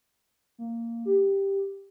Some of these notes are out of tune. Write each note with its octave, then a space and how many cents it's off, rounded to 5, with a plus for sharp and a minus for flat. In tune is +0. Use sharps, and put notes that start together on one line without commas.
A#3 -10
G4 +5